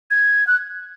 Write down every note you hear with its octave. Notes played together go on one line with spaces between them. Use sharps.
G#6
F#6